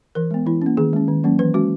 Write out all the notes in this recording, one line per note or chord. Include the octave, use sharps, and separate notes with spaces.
E3 A#4
G#3 B3
E3 E4
A#3 C#4
D#3 G#4
G#3 C#4
D#3
F#3 A#3 C#4
E3 B4
G#3 C#4 F#4